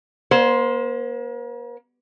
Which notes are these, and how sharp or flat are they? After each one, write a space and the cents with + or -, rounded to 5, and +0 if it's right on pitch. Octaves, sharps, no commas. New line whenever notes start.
A#3 +40 C5 +0